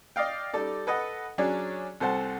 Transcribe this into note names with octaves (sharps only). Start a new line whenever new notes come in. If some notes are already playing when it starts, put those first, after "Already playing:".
D5 D#5 F5 G5
G3 D#4 A4 D5
A4 B4 D#5 F#5
F#3 C#4 D4 G#4 D5
C2 A4 C5 F#5 A5